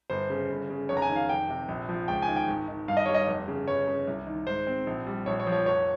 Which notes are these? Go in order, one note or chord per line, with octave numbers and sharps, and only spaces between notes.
G1 C5
C#3
G1
C#3
F1 C#5
A#5
G#5
D#3
F5
F1 G5
C3
A#1
F3
C#2 G5
G#5
D#3
G5
G#1
D#3
G2 F5
D#5
G3 C#5
D#5
F1
C#3
G1 C#5
C#3
C2
D#3
G#2 C5
C4
A#1
G3
A#1 C#5
C#5
F3
C#5
F1 C#5